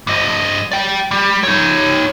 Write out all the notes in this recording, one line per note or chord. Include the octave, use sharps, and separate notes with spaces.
G2 D#5
D5 G5
G3
D#4 C#5